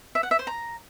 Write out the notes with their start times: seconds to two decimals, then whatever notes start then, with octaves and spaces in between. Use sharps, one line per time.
0.15 E5
0.23 F#5
0.31 E5
0.39 C5
0.47 A#5